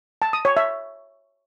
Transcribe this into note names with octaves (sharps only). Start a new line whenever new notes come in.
A5
D#6
C#5
E5